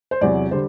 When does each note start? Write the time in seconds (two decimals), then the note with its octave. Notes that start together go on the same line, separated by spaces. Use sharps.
0.11 C5
0.21 E2 C3 F#3 D5
0.51 D3 G3 C5